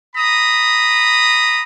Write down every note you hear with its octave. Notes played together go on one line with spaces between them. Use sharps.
A#5 B5 D#6